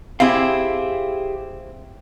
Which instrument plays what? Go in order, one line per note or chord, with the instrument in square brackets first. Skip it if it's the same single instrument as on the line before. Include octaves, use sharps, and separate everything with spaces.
[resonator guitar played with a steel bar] C4 E4 [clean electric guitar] G4 G#4 F5